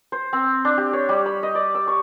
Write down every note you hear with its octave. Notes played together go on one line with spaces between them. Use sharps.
C5
C4
D4
G4
C#5
G3
B5
D#5
D5
E6
C#6